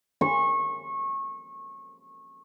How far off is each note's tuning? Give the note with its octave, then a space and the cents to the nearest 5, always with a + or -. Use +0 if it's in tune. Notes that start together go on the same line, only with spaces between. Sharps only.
C#6 -25